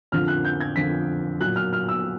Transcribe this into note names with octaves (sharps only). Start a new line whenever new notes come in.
F2 D3 F3 F6
F#6
G6
G#6
F2 D3 F3 B6
A#2 F#3 F#6
F6
F6
E6